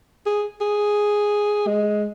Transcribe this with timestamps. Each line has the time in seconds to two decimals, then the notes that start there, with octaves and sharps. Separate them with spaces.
0.26 G#4
0.61 G#4
1.67 G#3